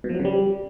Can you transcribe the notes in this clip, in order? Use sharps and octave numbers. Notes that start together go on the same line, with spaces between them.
B2
F3
F#3
C#3
G3